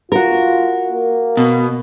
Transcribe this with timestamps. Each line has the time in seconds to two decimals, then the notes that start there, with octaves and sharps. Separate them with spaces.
0.12 F4 F#4 A#4
0.92 A#3
1.37 B2